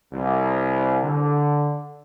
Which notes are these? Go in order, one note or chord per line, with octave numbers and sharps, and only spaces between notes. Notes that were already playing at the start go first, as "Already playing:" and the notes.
C2
D3